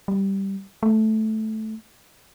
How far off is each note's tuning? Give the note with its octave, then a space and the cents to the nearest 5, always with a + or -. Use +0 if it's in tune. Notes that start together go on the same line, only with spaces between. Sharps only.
G3 -5
A3 -10